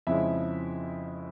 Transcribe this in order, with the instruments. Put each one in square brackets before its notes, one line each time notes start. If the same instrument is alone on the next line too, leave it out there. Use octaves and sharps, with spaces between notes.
[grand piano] F2 C#3 F3 G#3 E4 E5